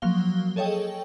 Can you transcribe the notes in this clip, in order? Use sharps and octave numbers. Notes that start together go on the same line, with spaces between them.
F3 F#3 A#3 F5 G7
G#4 A4 C#5 D#5 G5